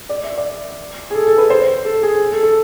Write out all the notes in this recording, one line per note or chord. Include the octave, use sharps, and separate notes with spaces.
D5
E5
D5
G#4
A4
A4
B4
C5
A4
G#4
A4
A4